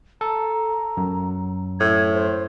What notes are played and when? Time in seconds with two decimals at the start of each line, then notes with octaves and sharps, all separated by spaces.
0.21 A4 A#5
0.97 F#2
1.80 A2 G#6
2.13 C5